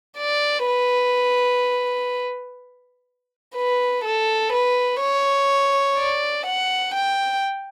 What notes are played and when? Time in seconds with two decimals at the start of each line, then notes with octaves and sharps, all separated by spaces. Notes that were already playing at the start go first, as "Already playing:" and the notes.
0.18 D5
0.66 B4
3.56 B4
4.05 A4
4.53 B4
5.01 C#5
5.97 D5
6.46 F#5
6.94 G5